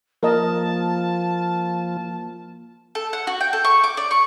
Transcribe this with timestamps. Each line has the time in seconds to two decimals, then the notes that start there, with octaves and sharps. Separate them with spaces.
0.23 F3 A#3 A#4 D#5 A5
2.95 A4
3.13 F#5
3.27 F#4
3.40 G5
3.53 A4
3.65 C#6
3.84 D6
3.97 D5
4.11 C#6